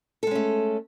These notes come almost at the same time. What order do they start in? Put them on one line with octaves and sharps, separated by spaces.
A4 G#3 C#4 A3